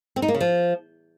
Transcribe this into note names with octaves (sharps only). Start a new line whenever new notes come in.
C4
D#4
A#3
C#3
F3